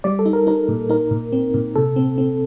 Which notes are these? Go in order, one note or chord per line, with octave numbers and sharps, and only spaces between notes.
G3 D5
A4
D#4
A#4
D#4 A#4
A#2
D#4 A#4
A#2
C4
A#2
C3 A4
C4
C4